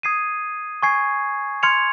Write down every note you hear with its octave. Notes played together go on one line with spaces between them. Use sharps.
D#6 G#6 C7 D#7
G#5 C#6 G#6 C7
C6 F6 G#6 C#7 F7